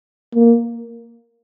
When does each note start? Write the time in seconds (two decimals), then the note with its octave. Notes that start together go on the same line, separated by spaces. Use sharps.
0.35 A#3